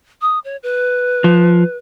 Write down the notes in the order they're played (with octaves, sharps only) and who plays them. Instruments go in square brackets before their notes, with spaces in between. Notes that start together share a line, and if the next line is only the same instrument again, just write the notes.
[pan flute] D#6
C#5
B4
[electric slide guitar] F3